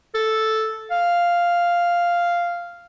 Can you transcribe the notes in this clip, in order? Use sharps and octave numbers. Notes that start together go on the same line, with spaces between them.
A4
F5